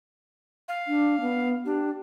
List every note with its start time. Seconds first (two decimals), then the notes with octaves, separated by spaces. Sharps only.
0.68 F5
0.87 D4
1.21 B3
1.65 D4 G4